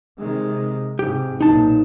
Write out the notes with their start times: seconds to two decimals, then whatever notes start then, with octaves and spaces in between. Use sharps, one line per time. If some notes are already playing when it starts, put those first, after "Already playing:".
0.18 C3 D#3 G#3
0.99 G#2 C3 G4
1.41 B1 A#2 D#4 A5